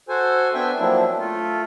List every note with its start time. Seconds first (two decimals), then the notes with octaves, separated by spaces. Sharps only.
0.09 F#4 A4 C5 G#5
0.54 B3 C4 D4 E5 G5 G#5
0.78 F3 F#3 A#3 C4 D4 E4
1.19 A3 F4